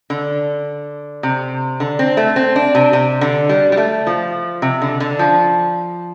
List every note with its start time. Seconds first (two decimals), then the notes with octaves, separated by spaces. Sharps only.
0.10 D3
1.23 C3
1.80 D3
1.99 C4
2.17 A3
2.36 C4
2.56 D4
2.75 C3
2.93 C3
3.21 D3
3.49 G3
3.72 G3
3.77 A3
4.07 F3
4.62 C3
4.82 D3
5.00 D3
5.19 F3